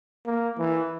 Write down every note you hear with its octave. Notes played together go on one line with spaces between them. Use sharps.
A#3
E3